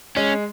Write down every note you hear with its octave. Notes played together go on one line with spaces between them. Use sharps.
G#3 C#4